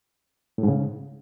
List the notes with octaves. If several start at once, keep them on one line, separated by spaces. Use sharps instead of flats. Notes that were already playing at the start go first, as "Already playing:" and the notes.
A2
G#2
C#3